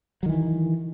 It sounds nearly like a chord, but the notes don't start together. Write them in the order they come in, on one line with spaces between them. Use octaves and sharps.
F#3 D#3 E3